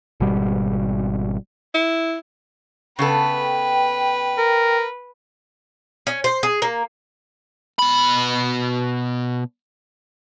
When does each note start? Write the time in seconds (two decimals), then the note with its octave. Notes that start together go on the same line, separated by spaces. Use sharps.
0.20 G#1 B2 G3
1.74 E4
2.99 C#3 B3 A4 B4 G5
4.38 A#4
6.07 C#4
6.24 C5
6.43 G#4
6.62 A#3
7.79 B2 B5